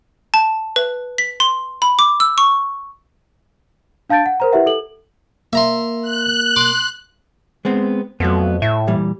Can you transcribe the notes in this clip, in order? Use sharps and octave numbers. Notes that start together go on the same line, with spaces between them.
A5
B4
B6
C6
B5
D6
E6
C#6
D4 F5 A5 G6 A6 D7
F#5
A#4 C5 A#5
E4 G4 B4 E5 F#5
A4 F#7
A#3 E5 A#5 C6
F#6
C6 D6
G#3 B3 C4
F2 F#3 A3 B3
A2 E5
A#2 E3 G3